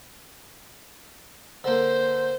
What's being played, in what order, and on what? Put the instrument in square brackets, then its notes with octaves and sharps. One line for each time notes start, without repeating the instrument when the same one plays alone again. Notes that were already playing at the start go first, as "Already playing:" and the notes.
[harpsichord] D3 A#3 [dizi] C5